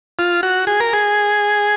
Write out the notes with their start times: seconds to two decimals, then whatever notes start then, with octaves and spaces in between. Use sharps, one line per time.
0.19 F4
0.43 F#4
0.67 G#4
0.80 A#4
0.93 G#4